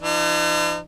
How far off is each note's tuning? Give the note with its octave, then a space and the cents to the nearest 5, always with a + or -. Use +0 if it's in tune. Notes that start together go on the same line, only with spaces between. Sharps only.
E3 +45 D#4 -45